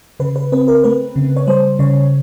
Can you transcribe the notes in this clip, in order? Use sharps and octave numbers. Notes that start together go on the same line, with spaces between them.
C#3 B4
B4
C4 B4
A#4
A3 B4
C#3
C#5
G3 C5
C#3 C#5